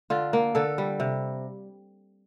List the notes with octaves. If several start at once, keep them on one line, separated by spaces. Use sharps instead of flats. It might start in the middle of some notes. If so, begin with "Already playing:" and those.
D3 F4
A#3
D3 A4
G3
C3